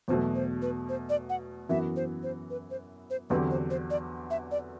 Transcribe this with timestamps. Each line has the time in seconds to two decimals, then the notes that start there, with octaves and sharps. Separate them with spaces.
0.08 E2 B2 F#3 A3 C5
0.35 C5
0.62 B4
0.89 C5
1.09 D5
1.29 F#5
1.69 F#2 E3 B3 F#4 E5
1.96 C5
2.23 C5
2.50 B4
2.70 C5
3.10 C5
3.30 E2 D3 F#3 C4 G4 B4
3.51 C5
3.70 C5
3.90 D5
4.31 E5
4.51 D5